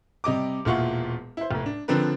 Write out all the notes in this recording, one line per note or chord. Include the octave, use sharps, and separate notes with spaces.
C3 G3 D#5 D6
E1 A#2 E4 F4 F#5 C#6
E4 C5
F1 A2
D4
D3 F3 C4 D4 A#4 B4